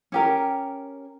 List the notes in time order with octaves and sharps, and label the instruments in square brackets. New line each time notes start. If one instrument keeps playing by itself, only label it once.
[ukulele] C#4 G4 A#4